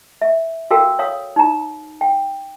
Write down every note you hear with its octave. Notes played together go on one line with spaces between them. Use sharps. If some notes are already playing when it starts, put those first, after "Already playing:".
E5
F#4 A4 A#4 F5 G5 E6
C#5 F5 D#6
D#4 A#5
G5